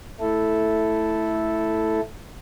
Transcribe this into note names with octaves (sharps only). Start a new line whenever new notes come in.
A3 E4 A4